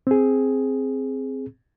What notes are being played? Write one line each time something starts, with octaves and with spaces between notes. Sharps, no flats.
C4 G#4